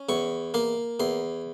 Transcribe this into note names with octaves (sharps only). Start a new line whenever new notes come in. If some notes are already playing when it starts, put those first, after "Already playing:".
Already playing: C#4
E2 C#6
A#3 C6
E2 C6